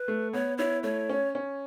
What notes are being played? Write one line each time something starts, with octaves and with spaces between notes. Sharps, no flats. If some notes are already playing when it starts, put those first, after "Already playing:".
Already playing: B4
A3
B3 C#5
E4 C#5
A3 C#5
C#4
C#4